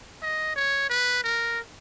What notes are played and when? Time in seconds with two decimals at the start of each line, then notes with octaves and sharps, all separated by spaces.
0.22 D#5
0.56 C#5
0.90 B4
1.24 A#4